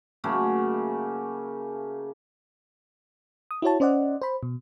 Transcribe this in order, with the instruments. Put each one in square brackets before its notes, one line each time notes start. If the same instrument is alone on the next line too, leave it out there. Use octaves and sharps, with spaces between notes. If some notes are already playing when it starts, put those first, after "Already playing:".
[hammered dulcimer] C#3 F#3 A3 A#3
[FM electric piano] D#6
E4 F#4 C#5 A5
C#4 C5 D5 D#5 F#5
C5 B5
B2